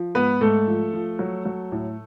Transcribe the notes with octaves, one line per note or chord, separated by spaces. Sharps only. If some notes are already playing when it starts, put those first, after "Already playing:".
Already playing: F3
G#2 B3 B4
G#2 A3 A4
F3
F3
F#3
F#3
A2